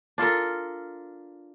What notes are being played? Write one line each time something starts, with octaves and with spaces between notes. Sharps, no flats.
D4 F4 A4 A#4